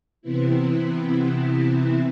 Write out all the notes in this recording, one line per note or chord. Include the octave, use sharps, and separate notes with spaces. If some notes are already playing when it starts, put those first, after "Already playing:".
C3 E3 B3 C4 E4